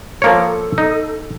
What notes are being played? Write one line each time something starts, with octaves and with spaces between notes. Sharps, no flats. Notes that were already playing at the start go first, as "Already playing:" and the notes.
F3 A#3 A4 C#5
D#4